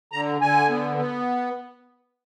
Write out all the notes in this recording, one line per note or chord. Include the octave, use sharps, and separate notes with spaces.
D3 A#5
D3 G#5
B3
B3